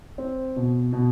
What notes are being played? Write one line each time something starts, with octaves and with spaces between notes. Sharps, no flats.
C4
B2
B2